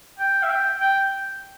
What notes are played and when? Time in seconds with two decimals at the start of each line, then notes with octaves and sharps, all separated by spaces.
0.19 G5
0.43 E5
0.50 G5
0.80 G5